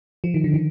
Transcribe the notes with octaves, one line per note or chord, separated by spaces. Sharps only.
F3
D#3
D3
D#3